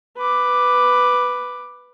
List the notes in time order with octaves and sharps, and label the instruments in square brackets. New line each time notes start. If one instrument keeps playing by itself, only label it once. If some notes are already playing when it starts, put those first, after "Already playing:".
[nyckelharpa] B4 D6